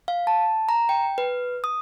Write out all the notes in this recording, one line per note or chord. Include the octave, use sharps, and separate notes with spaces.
F5
A5
A#5
G5
B4
D#6